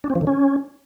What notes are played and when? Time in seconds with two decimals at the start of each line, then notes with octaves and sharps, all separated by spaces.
0.04 D4
0.10 C4
0.15 F3
0.21 D3
0.27 C#4